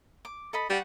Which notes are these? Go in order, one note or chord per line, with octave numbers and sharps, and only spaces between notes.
D6
A4 D#5 B5
G3 F#5 C#6